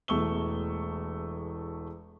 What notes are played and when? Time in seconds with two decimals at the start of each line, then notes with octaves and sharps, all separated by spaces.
0.08 E1 E2 A3 C#6 E6 G7